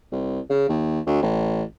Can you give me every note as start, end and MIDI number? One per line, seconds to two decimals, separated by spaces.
0.12 0.40 36
0.49 0.66 49
0.69 1.00 39
1.07 1.20 38
1.22 1.63 33